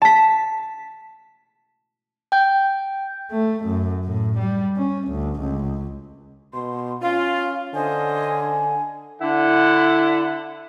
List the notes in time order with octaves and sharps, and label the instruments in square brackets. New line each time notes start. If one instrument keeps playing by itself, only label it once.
[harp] A5 B6
[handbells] G5 G6
[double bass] A3
F#2
A2
G3
C#4
D2
C#2
[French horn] B2 [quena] C6
[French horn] C#4 [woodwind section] F4 [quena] F5
[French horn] D3 [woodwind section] C#4 C5 D#5 [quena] G#5
[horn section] D3 E4 F#5